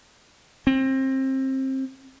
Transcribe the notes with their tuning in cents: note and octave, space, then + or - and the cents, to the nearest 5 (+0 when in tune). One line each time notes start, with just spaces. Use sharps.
C4 +25